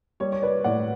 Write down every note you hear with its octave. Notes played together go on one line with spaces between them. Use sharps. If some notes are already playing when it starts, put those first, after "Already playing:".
G3 C#5
C#5
B4 D5
A2 D5 F#5